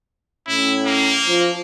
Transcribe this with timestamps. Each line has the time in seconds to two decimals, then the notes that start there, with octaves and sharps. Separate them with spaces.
0.47 A2 C#4 E4
0.86 A#3
1.26 F3